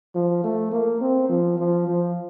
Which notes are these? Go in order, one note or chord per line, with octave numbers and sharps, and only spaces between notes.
F3
A3
A#3
C4
F3
F3
F3